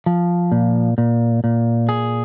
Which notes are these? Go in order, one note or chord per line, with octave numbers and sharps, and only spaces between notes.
F3
A#2
A#2
A#2
G#4